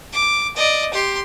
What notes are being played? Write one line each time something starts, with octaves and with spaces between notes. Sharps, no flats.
D6
D5 D#5
G4 C6